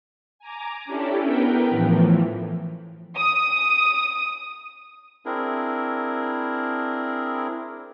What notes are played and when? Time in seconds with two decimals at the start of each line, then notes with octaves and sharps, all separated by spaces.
0.39 G#5 A#5 D6
0.85 C#4 D4 E4 G4 A4
1.25 B3 A#4 B4 G5
1.70 A2 E3 F3
3.18 D#6
5.26 C4 D4 E4 G#4 A#4